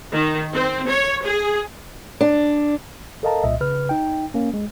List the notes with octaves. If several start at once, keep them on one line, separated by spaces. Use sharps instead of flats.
D#3
C4
C#5
G#4
D4
A4 A#4 D#5 F5 A5 A#5
C2 A#2 D#5 E5
C#3 B4 F6
D#4 G5
A#3 C#4
G#3